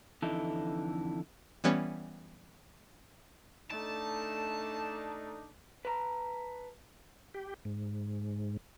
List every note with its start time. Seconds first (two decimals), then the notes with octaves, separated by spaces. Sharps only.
0.22 F2 D3 E3 D#4 E4 A4
1.64 E3 G3 B3 C#4
3.70 A3 D4 D#4 A5
5.85 B4 A5 A#5
7.34 G4
7.65 G#2